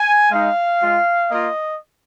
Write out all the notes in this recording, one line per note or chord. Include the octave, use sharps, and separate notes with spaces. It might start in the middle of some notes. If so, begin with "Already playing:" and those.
Already playing: G#5
G#3 D#4 F5
G#3 F4
A#3 F4 D#5